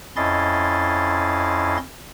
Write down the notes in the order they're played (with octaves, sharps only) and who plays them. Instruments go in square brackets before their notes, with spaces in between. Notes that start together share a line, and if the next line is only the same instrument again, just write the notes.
[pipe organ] F2 C#4 E4 D#5 C6 A6